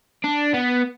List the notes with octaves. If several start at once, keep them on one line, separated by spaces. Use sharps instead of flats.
D4
B3